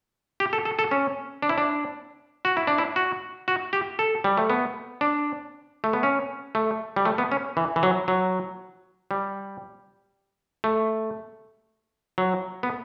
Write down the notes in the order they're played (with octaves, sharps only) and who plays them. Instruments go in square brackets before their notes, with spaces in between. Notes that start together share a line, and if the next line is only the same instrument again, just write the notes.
[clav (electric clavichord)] G4
A4
A4
A4
C#4
D4
E4
D4
F#4
E4
D4
E4
F#4
F#4
G4
A4
G3
A3
B3
D4
A3
B3
C#4
A3
G3
A3
B3
C#4
E3
E3
F#3
F#3
G3
A3
F#3
B3